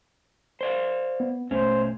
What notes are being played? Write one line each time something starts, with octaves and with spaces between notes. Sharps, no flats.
C5 D5 F5
B3
A1 B2 A3 C#4 C5